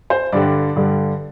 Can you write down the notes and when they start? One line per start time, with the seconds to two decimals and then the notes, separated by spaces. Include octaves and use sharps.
0.10 C5
0.32 G2 D3 G3 D5
0.76 G2 D3 G3